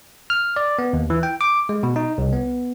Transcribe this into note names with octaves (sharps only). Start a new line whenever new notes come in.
F6
D5
B3
D#2
E3
G5
D6
G#3
B2
D#4
C2
B3